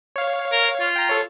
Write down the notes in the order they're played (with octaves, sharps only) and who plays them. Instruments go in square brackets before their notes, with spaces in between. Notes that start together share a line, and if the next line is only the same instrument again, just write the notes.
[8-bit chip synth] C#5 F5
[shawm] A#4
F4
[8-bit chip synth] G5 A#5
A4 C#5